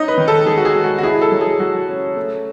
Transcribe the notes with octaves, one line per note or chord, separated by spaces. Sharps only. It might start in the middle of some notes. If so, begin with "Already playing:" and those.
Already playing: C#4 D#4 D#5
B4
D#3
A4
D#3 G#4
F#4
G#4
G#3
F#4
F#4
E4 G#4
A4
F#3
G#4
F#3 F#4
C#4
A3